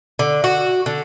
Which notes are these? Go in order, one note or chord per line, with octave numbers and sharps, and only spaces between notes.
D3
F#4
D3